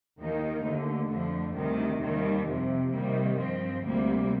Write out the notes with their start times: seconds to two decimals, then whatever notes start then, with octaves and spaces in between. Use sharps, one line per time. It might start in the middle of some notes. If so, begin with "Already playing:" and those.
0.19 D#2 D#3 A#3 D#4
0.64 D#2 D3 A3
1.09 F2 D3 F3 A3
1.55 D2 C3 D#3 G3
2.01 D#2 D#3 G3
2.47 F2 C3 F3
2.93 C3 D#3 G3 A#3
3.37 G2 F3 C4
3.83 D2 C3 G3 A#3